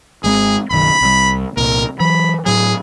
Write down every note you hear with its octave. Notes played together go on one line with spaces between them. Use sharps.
G#1 G#3 C4 G#4
F#1 B1 D#3 B5
C2 G3
C2 A#2 A#4
E3 F#3 B5
A2 F#3 G#4